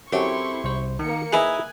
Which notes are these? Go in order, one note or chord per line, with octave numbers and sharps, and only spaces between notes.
F#2 C4 E4 G4 A4 C6 C#6
C2 C5
D#3 A#3 C#7
D#4 E4 G#4 B4 D#5 G#5 F#6